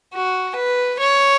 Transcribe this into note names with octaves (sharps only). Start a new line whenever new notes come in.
F#4
B4
C#5